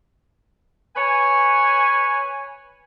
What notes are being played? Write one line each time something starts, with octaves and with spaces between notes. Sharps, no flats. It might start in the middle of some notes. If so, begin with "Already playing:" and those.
B4 C#5 G#5